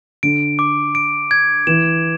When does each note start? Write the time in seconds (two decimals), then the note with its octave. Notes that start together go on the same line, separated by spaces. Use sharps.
0.23 D3 D7
0.59 D6
0.95 D7
1.31 G#6
1.67 E3 E7